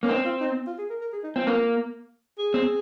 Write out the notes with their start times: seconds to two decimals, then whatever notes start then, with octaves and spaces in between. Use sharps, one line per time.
0.03 A#3 C#4
0.09 C4 D#4
0.25 F4
0.41 D#4
0.67 F4
0.78 G#4
0.90 A#4
1.01 A#4
1.13 G#4
1.24 D#4
1.36 C4 F4
1.47 A#3
2.39 G#4
2.54 C4